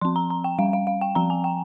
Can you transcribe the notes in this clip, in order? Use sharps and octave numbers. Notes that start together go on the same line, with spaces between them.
F3 C4 C6
A#5
A#5
G5
G3 C#4 F5
F5
F5
G5
F3 C4 A#5
G#5
G5